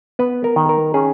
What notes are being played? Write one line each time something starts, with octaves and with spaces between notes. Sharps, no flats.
B3 B4
A#4
D#3
A#4
C#4 G#4